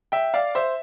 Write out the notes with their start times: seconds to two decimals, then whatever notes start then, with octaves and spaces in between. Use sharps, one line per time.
0.12 E5 G5
0.34 D5 F5
0.55 C5 E5